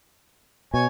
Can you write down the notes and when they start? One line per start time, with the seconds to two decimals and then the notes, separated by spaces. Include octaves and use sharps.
0.74 B2 C#5 G#5